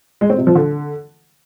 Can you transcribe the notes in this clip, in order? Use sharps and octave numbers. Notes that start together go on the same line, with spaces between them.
G#3
C4
C3
F3
D3